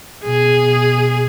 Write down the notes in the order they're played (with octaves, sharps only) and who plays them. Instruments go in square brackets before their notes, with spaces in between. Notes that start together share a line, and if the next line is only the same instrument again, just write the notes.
[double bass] B2 [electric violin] G#4